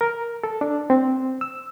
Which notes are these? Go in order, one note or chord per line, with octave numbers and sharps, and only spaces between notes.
A#4
A4
D4
C4
E6